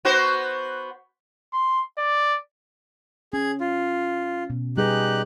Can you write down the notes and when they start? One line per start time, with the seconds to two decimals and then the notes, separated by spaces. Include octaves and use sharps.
0.05 B3 F#4 C5
1.53 C6
1.98 D5
3.33 C#4 G#4
3.60 F4
4.50 B2
4.77 G3 D#4 G4 G#4 B4 F#6